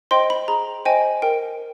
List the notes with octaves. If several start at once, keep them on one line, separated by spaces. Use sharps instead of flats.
C5 D#5 G5 C6
B5
G#4 A#5
C5 D#5 G5 G#5
A#4 G5